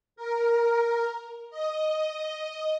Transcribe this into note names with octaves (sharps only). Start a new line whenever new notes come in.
A#4
D#5